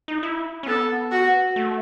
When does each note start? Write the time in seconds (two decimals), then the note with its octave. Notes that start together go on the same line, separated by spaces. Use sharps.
0.08 D#4
0.23 E4
0.63 C#4
0.67 B3 A4
1.11 F#4
1.56 A3